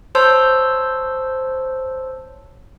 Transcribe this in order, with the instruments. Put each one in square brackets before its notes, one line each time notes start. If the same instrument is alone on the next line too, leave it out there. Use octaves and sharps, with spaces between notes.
[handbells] C5 C#5 A5 C6 E6 G6